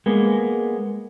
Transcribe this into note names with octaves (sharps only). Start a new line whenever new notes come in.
G#3 A#3 B3